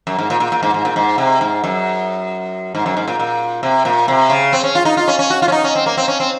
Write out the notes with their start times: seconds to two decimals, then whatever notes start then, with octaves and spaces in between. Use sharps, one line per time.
0.07 F#2
0.19 G#2
0.30 A#2
0.40 A#2
0.52 A#2
0.63 G#2
0.74 G#2
0.85 A#2
0.96 G#2
1.18 C3
1.41 G#2
1.64 F#2
2.75 G#2
2.86 F#2
2.97 G#2
3.08 A#2
3.19 A#2
3.63 C3
3.85 A#2
4.08 C3
4.30 C#3
4.53 C4
4.64 C#4
4.75 F4
4.85 D#4
4.97 F4
5.08 C#4
5.19 C#4
5.30 F#4
5.42 F4
5.48 C#4
5.52 D#4
5.64 C#4
5.75 C4
5.86 A#3
5.97 C4
6.08 C#4
6.20 C4